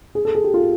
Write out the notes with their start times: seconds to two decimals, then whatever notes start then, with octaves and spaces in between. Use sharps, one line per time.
0.15 G#4
0.25 A4
0.35 G#4
0.44 G4
0.54 F4